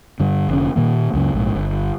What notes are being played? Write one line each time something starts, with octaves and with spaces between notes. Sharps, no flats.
G2 D3
F1 D3 C#4
A#2 D#3 A#3
C#2 F#2 C#3
A#1 G#2
G1